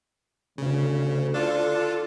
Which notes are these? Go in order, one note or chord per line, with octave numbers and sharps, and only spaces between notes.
D2 C#3
D4 F4 A4